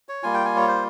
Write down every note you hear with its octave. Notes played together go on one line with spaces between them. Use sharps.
C#5
G3 A#3 F4 G#5
G5
G#5
C#5
C5